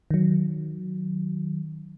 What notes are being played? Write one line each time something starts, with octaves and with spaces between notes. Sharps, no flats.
D#3 F#3